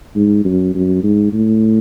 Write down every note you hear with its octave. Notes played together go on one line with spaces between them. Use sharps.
G#2
F#2
F#2
G#2
A2